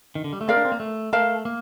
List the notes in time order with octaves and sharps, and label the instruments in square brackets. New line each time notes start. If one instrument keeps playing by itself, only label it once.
[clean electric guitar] D#3
D3
G3
A3
[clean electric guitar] C4 [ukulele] A#4 D5 F5
[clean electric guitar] D4
C4
A#3
A3
[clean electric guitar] A3 [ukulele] A#4 F5 A5
[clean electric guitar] A#3